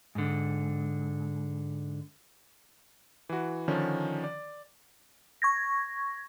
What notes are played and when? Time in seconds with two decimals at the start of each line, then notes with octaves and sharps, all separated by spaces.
0.15 G#2 D3
3.29 E3 F#4
3.68 D3 D#3 F3 C#4 D4
4.24 D5
5.42 C#6 G#6 A#6